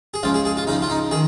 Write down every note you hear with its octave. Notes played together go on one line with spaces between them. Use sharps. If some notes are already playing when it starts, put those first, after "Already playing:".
G#4
C#2 C#3 F3 F4
G#4
G#4
F4
C#2 C#3 F3 D#4
F4
D#4
D#3 G#4